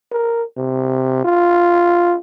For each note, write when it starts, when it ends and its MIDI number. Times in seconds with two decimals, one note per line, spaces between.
0.12 0.43 70
0.57 1.20 48
1.24 2.16 65